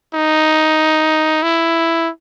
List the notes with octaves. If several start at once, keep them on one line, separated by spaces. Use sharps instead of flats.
D#4
E4